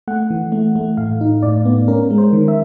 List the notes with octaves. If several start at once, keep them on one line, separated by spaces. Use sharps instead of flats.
A3 F#5
E3
A3
A3
A2 F5
D#4
A2 D5
B3
C#4 A#4
G#3
C5
D#3
E5